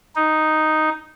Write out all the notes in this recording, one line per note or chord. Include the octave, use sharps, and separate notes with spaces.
D#4